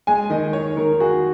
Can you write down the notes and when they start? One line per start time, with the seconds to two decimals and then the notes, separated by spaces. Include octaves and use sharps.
0.07 G#3 G#5
0.30 D#3 D#5
0.53 D#3 C#5
0.76 D#3 A#4
1.00 F#4 G#4